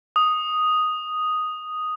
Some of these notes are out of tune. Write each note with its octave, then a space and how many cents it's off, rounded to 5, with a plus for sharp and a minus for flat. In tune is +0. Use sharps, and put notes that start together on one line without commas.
D#6 +0